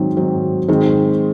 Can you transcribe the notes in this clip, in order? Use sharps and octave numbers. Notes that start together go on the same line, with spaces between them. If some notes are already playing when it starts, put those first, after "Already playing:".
Already playing: G#2 D#3 F#3 C4
G#2 D#3 F#3 C4
G#2 D#3 G#3 C4